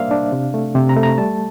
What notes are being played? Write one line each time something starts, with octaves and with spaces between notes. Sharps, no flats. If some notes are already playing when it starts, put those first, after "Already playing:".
Already playing: G3 A#3 D4 C5 D5 E5 F5
D4
C3
A3
C3
A#5
A3
A#5
G3 A5